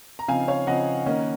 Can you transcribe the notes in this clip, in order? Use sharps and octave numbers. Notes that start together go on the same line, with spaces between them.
A#5
C#3 F3 C4 D#4 F5 G#5
C#5 F5
C#3 F3 C4 D#4 D#5 F#5
D#3 A#3 C#4